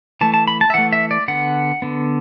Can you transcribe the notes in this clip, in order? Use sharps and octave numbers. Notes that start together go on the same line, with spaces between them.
E3 A3 A5
A5
B5
A5
E5
E3 A3 F#5
E5
D5
D3 B3 F#5
D3 B3